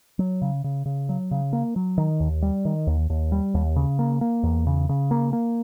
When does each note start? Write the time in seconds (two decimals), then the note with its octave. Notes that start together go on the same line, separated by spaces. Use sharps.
0.19 F#3
0.42 C#3
0.64 C#3
0.86 C#3
1.09 F#3
1.31 C#3
1.53 A#3
1.76 F#3
1.98 D#3
2.20 D#2
2.42 G3
2.65 D#3
2.87 D#2
3.10 D#2
3.32 G3
3.54 D#2
3.76 C#3
3.99 A#3
4.21 A#3
4.43 E2
4.67 C#3
4.89 C#3
5.11 A#3
5.33 A#3